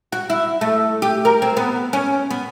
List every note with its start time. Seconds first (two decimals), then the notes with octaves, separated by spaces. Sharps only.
0.12 F#4
0.30 E4
0.61 A3
1.02 G4
1.25 A#4
1.42 C4
1.57 B3
1.93 C#4
2.31 B3